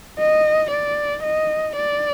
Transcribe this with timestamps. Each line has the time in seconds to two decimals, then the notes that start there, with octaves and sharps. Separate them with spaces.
0.19 D#5
0.71 D5
1.24 D#5
1.76 D5